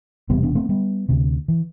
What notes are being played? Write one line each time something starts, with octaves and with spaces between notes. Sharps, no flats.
E1 E2 C3 G3 B3
B3 D4
A3 C4
G3 B3
D2 C3
E3